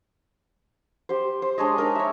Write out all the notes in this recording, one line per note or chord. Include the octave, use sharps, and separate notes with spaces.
G4 C5
C5
G#3 D4 C#5 D#5
D4 D#4 A#4
C#5 E5